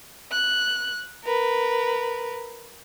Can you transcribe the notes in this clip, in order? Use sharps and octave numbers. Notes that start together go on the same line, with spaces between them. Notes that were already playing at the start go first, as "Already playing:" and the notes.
F#6
A#4 B4